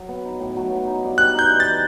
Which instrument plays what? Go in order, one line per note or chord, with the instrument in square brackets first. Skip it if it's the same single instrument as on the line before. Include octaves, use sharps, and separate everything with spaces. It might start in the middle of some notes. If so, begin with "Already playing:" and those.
Already playing: [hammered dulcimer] F#3
B3
D#4
A2
F#3
B3
D#4
G2
[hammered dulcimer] G3 [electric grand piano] F#6
[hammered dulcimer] D#4 [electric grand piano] G6
[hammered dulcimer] E3
[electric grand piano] A6
[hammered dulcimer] E3